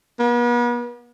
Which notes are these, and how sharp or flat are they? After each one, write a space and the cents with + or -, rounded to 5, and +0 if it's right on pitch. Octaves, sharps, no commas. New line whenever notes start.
B3 -40